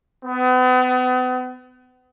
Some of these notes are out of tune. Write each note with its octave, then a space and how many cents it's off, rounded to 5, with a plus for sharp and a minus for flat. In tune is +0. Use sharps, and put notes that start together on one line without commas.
B3 +40